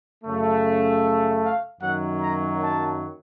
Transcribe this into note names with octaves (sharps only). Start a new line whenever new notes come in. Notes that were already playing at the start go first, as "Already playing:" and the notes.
F#2 C#3 A3
F5
F#2 D#3 F#3 A#3 F#5
A#5
A5